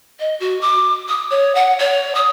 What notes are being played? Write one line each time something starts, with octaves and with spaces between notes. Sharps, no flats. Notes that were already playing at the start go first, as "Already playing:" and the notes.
D#5
F#4
D6
D#6
C#5
F#5
C#5
D#6